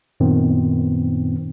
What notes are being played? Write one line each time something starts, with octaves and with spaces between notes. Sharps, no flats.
F#2 A#2 D#3 B3 C4